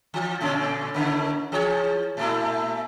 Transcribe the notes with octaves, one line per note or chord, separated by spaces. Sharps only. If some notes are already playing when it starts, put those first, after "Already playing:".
E3
A#2 D3 C#4
A2 C#3 A#3
E3 G#4 C#5
A#2 A3 E4